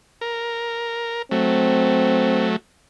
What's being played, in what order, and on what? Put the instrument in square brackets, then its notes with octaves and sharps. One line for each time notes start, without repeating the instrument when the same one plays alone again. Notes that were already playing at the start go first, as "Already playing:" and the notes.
[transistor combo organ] A#4
[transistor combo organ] F#3 A3 [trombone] C4